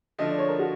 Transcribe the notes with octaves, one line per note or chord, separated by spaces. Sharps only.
D3 F3 A3 D#5
D5
C#5
A#4
F#4